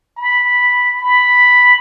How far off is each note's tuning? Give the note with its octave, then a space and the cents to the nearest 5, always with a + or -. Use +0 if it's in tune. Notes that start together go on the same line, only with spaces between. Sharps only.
B5 -5
B5 +0